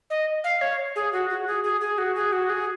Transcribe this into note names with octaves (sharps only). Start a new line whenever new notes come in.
D#5
F5
C#5
G#4
F#4
F#4
G#4
G#4
G#4
F#4
G#4
F#4
G#4